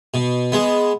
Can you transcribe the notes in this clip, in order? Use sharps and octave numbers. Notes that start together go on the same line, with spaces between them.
B2
G#3 B3